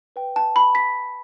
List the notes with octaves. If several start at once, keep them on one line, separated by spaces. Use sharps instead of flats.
B4 G5
A5
B5
B6